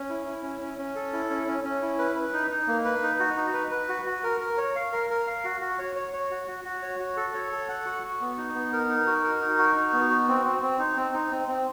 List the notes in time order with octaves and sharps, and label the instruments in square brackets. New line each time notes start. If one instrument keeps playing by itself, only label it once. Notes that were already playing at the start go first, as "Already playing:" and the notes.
Already playing: [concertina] C#4
E4
E4
C#4
C#4
C#4
A4
E4
C#4
C#4
C#4
E4
B4
B4
D#4
D#4
A#3
B4
D#4
F#4
D#4
B4
B4
F#4
F#4
A#4
A#4
C#5
F5
A#4
A#4
F5
F#4
F#4
C#5
C#5
C#5
F#4
F#4
F#4
C#5
F#4
A4
C#5
A4
F#5
F#4
F#4
B3
D#4
B3
A#4
D#4
F#4
A#4
D#4
F#4
D#4
B3
F#4
C4
C4
C4
D#4
C4
D#4
C4
C4